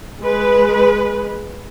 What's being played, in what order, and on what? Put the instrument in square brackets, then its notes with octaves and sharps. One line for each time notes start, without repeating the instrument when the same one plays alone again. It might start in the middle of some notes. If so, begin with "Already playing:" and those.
[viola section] G#3 B4